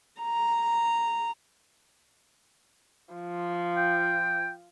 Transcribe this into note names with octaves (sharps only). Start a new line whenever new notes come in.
A#5
F3
G5